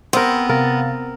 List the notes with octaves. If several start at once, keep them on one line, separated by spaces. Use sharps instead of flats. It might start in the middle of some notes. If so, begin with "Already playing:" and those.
B3 C4 A#4
C3 A#4 F5 A6